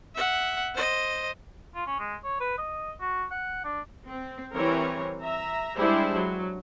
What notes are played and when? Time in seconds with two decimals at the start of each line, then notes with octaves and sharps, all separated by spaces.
0.15 E5 F#5
0.75 C5 D#5
1.75 F4
1.87 C#4
2.00 G#3
2.24 C#5
2.40 B4
2.58 D#5
3.01 F#4
3.31 F#5
3.64 D4
4.09 C4
4.53 E3 G3 C4 A#4 C#5
5.22 E5 A#5
5.77 G3 G#3 D4 E4 G4 C5
6.15 F#3